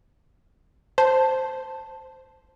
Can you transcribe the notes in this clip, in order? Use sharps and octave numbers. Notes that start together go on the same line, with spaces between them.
C5 A5